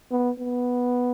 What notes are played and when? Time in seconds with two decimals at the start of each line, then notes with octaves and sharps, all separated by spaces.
0.11 B3
0.39 B3